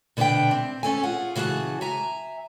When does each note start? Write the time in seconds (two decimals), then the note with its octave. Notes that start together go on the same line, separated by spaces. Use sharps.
0.17 B2 D3 D4 G#4 E5 G5
0.51 C4
0.83 A3 C#4 A4 G#5
1.03 F4 G#4 F#5
1.35 C#3 E3 F#4 G#4 A5
1.81 E5 G#5 A#5